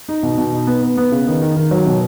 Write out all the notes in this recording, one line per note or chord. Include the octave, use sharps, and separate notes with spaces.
D#4
B2
B2
D#4
B3
B3
B3
C#3
D#3
D#3
D#3
F#3
B2